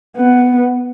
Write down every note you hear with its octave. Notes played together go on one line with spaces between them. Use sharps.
B3